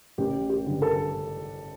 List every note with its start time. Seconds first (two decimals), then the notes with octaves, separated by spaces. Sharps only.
0.18 A1 G4
0.49 G4
0.66 G2 D3
0.82 A4